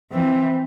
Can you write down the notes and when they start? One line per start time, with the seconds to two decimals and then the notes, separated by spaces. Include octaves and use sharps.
0.12 E3 C4